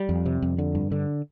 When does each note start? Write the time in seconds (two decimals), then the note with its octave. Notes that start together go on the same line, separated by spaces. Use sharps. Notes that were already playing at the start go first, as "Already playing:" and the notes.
Already playing: G3
0.09 F2
0.26 C3
0.42 F2
0.58 D3
0.75 G2
0.92 D3